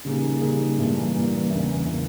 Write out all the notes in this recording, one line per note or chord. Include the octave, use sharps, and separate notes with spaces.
C#3 G3 A#3 D#4 G#4
C#3 G3 A#3 D#4 G#4
G2 E3 A#3
G2 E3 A#3
E2 C#3 E3 A#3
C#3 E3 A#3